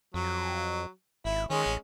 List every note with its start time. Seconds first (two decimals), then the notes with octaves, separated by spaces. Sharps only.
0.14 F2 F#3
1.25 G#1 E4
1.50 D#3 G#3 C#4
1.66 A1